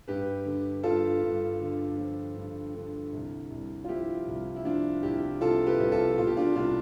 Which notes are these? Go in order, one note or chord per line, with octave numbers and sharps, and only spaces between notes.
G2 G4 B4
D3
G2 F4 A4
G2
D3
F3
G2
D3
C2
C2
F4
F3 E4 G4
C2
E4
F3 D4 F4
C2 E4 G4
C3 F4 A4
G4 B4
C2 G4
F4 A4
B2 F4
G4
D4 F4
C2 D4 F4